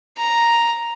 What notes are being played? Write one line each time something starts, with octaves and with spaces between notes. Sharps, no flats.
A#5